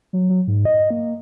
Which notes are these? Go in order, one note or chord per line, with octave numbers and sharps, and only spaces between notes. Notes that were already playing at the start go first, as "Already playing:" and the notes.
F#3
F#3
G#2
D#5
A#3